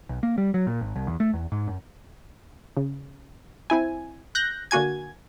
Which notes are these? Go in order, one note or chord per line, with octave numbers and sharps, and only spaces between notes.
B1
A#3
G3
F#3
A#2
G#1
C2
E2
A3
E2
G#2
F#2
C#3
C4 E4 G#5
F#6 G6 A#6
D3 A#3 F#4 G#5 G#6